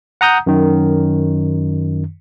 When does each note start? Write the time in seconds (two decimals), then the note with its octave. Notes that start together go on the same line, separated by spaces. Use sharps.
0.21 F#5 A#5 D#6 G6
0.47 F#2 D#3